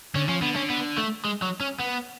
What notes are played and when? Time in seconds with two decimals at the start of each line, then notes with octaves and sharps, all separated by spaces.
0.15 D3 C#4
0.28 F3 C#4
0.41 D3 B3
0.56 C#4
0.70 B3
0.98 A3
1.25 G#3
1.42 F#3
1.60 C#4
1.80 B3